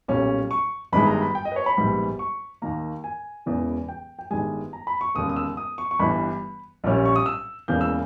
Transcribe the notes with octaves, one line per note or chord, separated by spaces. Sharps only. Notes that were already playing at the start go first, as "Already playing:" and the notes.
B1 A#2 G3 C#4
C#6
G1 G2 D#3 G#3 B5
A#5
B5
G5
D#5
B4
C#5
B5
A#1 G#2 G3 B3
C#6
D#2 D#3 A#3 A#5
G#5
E1 E2 C#3 E3
G5
G5
G1 G2 D#3 G#3 G#5
A#5
B5
C#6
E1 D#2 C#3 D#6
D#6
E6
D#6
C#6
C#6
G1 G2 E3 B5
A#1 A#2 G3 C#4
C#6
D#6
E6
E1 E2 C#3 E3 A#3 G6
E6